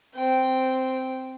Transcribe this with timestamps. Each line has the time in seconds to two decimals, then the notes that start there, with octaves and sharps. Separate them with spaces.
0.15 C4 G5